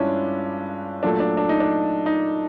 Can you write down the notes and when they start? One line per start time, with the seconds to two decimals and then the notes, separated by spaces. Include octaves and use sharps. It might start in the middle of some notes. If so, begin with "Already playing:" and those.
Already playing: G2 G#3 C#4 D4 E4 F4
1.03 A#2 F#3 A3 D4
1.20 D4
1.37 D4
1.49 D#4
1.60 D4
2.06 D#4